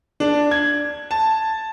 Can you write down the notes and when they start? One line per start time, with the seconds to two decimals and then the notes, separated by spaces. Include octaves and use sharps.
0.20 D4
0.51 G#6
1.11 A5